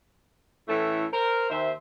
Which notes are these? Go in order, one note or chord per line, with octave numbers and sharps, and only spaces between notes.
A2 E3 A3 C#4 E4 A4
A#4 C5
D#2 C5 E5